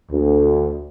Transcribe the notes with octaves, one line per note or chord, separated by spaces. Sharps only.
D2